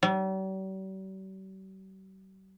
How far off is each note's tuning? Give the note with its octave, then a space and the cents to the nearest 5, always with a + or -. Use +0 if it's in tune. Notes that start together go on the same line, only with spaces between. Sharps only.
G3 -45